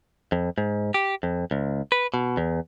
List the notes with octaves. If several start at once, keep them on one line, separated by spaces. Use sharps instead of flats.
F2
G#2
G4
F2
C#2
B4
B2
E2